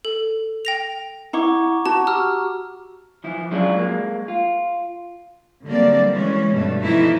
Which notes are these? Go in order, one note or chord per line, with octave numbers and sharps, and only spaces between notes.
A4
G5 A#6 F7
E4 F#5 A#5 C#6 D6
F#4 A5
G4 A#5 E6 F6
E3 F3 E4
F#3 G#3 C#4 D4 E4 F4
G#3 A#3
F4
D3 F#3 G3 A#3 C4 D5
E3 G#3 C#4
G2 B2 A3
E3 F3 A3 B3 D#4 E4